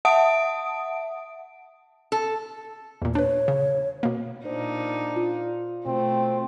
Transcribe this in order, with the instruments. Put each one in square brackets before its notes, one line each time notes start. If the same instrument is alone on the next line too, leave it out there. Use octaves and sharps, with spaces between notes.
[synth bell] E5 F#5 A5 D#6 D7
[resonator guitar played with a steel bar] A4
[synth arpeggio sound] E2 A#2
[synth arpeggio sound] D4 B4 [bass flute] C#5
[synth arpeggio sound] C#3
B2 A#3
[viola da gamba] A#2 D#4 [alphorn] D4 [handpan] C5
[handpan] F4
[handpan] B2 [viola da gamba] A3 [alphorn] C4